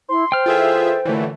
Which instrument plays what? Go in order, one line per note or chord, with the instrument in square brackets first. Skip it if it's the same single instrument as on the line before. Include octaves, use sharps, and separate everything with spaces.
[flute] E4 [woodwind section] C6
[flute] C5 [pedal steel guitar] G5 F6
[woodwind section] E3 A4 [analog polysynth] F4 G#4 E5
[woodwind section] F#2 A#2 D3 [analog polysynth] E3 A3